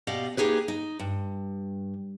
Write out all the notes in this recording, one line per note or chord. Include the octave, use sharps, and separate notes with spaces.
B2 G4 D5 D#5 F5
A#3 D#4 G4 G#4 B4
D#4
G2